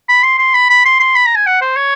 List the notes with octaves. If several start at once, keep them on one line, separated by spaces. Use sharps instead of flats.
B5
C6
C6
B5
B5
C6
C6
B5
A#5
G#5
F#5
C5
C#5